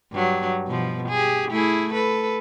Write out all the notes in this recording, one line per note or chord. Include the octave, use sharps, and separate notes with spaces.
G2 F#3
B2 F3
G4 G#4
A3 E4 G#4
A4 B4